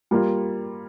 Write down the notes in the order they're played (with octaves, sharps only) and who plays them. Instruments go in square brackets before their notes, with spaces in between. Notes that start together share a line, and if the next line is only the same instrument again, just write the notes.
[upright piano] G3 A#3 F4